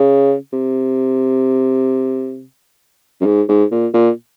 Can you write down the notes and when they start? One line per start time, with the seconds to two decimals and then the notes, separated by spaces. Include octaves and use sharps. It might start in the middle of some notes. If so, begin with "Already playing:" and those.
Already playing: C#3
0.53 C3
3.21 F#2
3.26 G#2
3.49 G#2
3.71 A#2
3.94 A#2